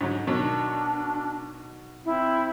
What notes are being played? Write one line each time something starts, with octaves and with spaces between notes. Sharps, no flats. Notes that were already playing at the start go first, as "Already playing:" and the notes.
G#2 D3 F#3
B2 D#3 F#3 D4
C4 E4